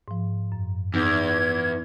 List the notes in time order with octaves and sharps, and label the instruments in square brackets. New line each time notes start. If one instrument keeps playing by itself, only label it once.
[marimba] G#2 F3
F#2
[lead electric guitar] E2 [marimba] D#4 [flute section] G#6